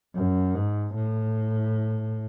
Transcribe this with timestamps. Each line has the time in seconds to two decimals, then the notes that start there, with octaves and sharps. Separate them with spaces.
0.16 F#2
0.54 G#2
0.94 A2